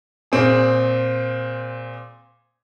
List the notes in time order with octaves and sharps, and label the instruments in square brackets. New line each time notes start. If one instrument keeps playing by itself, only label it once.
[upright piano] A#2 C4 G#4